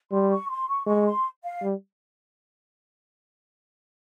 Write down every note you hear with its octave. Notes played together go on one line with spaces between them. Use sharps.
G3 C6
C#6
C6
C#6
G#3 C#6
C6
F5
G3